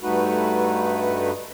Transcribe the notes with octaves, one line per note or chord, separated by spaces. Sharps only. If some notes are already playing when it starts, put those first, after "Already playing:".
G2 A3 D#4 F#4 B4